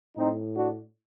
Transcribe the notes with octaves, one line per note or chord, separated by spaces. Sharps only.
A2 C4 D#4
D4 F#4